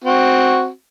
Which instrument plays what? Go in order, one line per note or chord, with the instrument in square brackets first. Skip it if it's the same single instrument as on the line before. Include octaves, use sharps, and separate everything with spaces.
[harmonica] C4 F#4